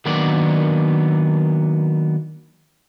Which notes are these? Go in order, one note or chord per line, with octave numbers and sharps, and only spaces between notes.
D#3 F#3 A#3 B3 D4 D5